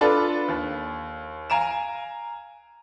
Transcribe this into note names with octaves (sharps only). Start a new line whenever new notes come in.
D4 F4 A4 B4 D5
D#2
F5 G#5 A#5 D7 E7